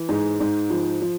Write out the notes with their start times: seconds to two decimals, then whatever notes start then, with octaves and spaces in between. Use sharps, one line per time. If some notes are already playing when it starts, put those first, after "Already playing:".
Already playing: E3
0.09 G#2 G#4
0.40 G#2
0.70 F3
1.02 F3